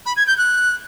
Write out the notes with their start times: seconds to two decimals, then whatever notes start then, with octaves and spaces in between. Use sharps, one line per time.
0.06 B5
0.17 G#6
0.27 G6
0.38 F#6